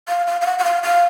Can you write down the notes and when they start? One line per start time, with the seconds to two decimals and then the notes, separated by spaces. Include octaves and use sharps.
0.08 F5
0.27 F5
0.41 F5
0.46 F#5
0.59 F#5
0.64 F5
0.83 F5